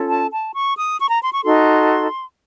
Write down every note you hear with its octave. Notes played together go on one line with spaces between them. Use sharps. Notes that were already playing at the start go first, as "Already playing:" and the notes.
Already playing: C#4 F4 A4
A5
A5
C#6
D#6
C#6
A#5
C6
C#6
D#4 F#4 A4 C6